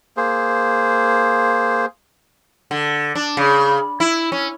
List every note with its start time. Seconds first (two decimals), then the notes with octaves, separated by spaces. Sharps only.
0.17 A#3 G#4 C5
2.71 D3
3.15 D4
3.37 C#3
4.00 E4
4.32 C#4